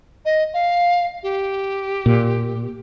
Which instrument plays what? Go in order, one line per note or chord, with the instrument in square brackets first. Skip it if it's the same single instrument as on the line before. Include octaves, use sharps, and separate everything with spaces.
[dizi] D#5
F5
G4
[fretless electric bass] A#2